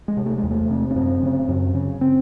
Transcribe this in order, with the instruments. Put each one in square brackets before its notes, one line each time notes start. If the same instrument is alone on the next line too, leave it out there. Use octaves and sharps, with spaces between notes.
[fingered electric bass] G#3
C3
A3
E2 G#3
A3
C3
C#4
F#2 C4
C#3
F#2
C#3
C4